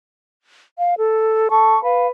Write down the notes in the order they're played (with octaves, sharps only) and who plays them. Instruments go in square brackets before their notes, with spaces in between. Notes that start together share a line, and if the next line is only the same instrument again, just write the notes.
[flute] F5
A4
[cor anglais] A4 [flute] C#6
[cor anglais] B4 [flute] F5